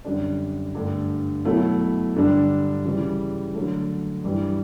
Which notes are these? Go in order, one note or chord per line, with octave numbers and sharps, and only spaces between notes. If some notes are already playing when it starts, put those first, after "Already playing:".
F#2 D3 G3 D4
G2 D3 A3
B2 F#3 A3 E4
G2 D3 G3 D4
C#3 E3 G3
D3 F#3 A3
G2 E3 G3